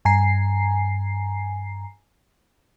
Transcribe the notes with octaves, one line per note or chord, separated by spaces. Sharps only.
G2 G#5 A#5 C7